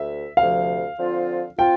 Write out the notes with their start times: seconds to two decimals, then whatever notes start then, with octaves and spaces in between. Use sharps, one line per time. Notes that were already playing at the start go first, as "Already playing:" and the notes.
Already playing: D2 E5
0.37 D2 C3 F3 F5
0.98 D3 F3 C4 F4
1.59 C4 F4 G5